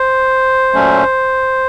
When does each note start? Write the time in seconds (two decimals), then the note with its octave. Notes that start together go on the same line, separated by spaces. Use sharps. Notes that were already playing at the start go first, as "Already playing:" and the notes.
Already playing: C5
0.73 A#2 F#3 A3 C#4